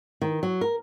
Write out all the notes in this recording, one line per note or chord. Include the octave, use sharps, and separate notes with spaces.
D#3
F#3
A#4